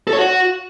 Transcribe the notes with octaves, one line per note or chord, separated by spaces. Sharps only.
A4
C#5
F#4